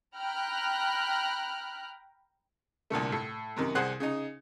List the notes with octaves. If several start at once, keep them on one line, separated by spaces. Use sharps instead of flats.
G5 A#5 B5 F6 F#6
C2 A#2 D3 A3
A2
F#2 C3 D#3
C2 G#4 C5 F#5 C6 F#6
C#3 D#4